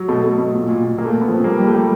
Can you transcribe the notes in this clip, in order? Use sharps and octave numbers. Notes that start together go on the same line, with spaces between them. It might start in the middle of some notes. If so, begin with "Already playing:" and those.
Already playing: F#3
B2 A3
A3
B2
A#2
A#2
A#2
A#2 A#3
A3
A#2 A#3
B3
F3 C4
G3 A#3
G3
A3
G3 A#3